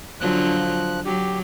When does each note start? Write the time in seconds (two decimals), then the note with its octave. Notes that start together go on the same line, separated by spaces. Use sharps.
0.20 D3 F3 F#3 F4 F#6
1.05 F#3 G4